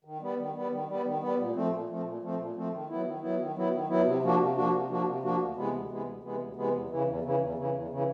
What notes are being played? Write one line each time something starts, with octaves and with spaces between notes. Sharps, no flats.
D#3
G3 B3
D#3
G3 B3
D#3
G3 B3
D#3
G3 B3
A#2
F3 A3 C4
A#2
F3 A3 C4
A#2
F3 A3 C4
A#2
F3 A3 C4
D#3
F#3 B3 E4
D#3
F#3 B3 E4
D#3
F#3 B3 E4
D#3
F#3 B3 E4
C3
F3 A#3 D4 F#4
C3
F3 A#3 D4 F#4
C3
F3 A#3 D4 F#4
C3
F3 A#3 D4 F#4
D2
C3 E3 G#3 B3
D2
C3 E3 G#3 B3
D2
C3 E3 G#3 B3
D2
C3 E3 G#3 B3
E2
C#3 E3
E2
C#3 E3
E2
C#3 E3
E2
C#3 E3